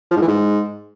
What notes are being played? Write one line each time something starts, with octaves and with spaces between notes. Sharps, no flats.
F3
G#2
E3
G#2